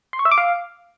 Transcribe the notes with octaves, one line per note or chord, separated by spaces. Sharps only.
C6
C#6
E5
D6
F5